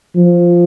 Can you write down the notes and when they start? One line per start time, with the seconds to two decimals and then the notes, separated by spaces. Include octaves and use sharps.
0.16 F3